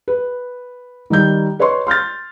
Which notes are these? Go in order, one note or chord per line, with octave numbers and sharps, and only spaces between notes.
B4
D#3 G3 D#4 G6
B4 C#5 D#5 C6 C#6
C6 F6 G6 A6